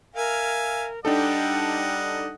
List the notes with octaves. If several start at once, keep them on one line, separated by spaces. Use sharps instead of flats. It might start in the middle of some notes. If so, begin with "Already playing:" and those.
A#4 E5 F5 G#5
G3 D4 D#4 A4 D#5 F#5 G5